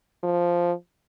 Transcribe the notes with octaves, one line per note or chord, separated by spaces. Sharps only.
F3